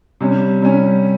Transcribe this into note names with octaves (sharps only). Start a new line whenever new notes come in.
C3 G3 C#4
C3 G3 C#4